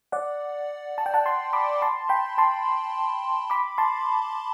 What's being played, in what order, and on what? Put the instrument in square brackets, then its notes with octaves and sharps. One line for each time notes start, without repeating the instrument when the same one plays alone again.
[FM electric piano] D5 F#5
A5
G5
F#5 A5
A5 C6
B5 D6
A5 C6
G5 B5
A5 C6
B5 D6
A5 C6